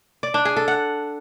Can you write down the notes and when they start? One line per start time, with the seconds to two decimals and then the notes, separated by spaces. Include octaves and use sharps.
0.23 D5
0.34 D4
0.45 G#4
0.57 A4
0.68 F#5